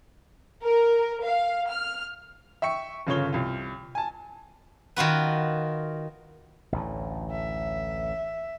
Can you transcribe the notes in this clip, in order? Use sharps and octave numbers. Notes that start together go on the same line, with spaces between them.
A#4
F5
F6
E5 G5 C#6 C#7
G1 C#3 F4 C#5 G7
C2 F4
G#5 A5
D#3 F4 F#4 B4
A1 D2 A2
E5